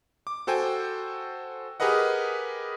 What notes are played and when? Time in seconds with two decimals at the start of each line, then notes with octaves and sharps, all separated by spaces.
0.27 D6
0.47 F#4 A4 C5 G5 G#5
1.80 G4 G#4 A#4 B4 D#5 F#5